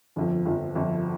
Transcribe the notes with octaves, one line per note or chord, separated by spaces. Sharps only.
G1 F2 F3
G1 F2 F3
G1 F2 F3